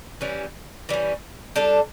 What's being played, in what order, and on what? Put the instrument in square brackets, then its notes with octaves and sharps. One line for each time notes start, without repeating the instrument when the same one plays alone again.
[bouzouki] E3 G3 C#4
E3 G3 C#4
G3 D4 A4